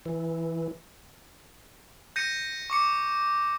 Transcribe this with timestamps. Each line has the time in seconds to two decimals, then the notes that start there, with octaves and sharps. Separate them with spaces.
0.06 E3
2.16 G6 A#6 C#7 D#7
2.70 C#6 D6 C#7